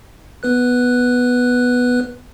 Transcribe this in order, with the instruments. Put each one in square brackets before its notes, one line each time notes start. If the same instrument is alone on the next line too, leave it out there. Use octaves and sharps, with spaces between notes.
[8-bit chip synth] B3 B4 F#6